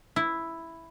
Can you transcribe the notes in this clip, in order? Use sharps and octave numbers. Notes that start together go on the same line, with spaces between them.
E4